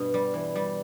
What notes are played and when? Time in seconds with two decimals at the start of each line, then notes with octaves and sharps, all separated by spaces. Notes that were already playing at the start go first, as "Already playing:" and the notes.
Already playing: G2 B2
0.14 G3
0.34 E3
0.56 G3